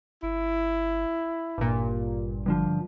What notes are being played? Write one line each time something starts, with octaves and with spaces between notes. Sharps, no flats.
G1 E4
G#1 G2 A#2
G2 D3 F3